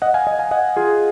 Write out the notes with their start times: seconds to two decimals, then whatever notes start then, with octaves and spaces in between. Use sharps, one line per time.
0.02 D#5 F#5
0.14 F5 G#5
0.27 D#5 F#5
0.39 F5 G#5
0.51 D#5 F#5
0.77 F4 G#4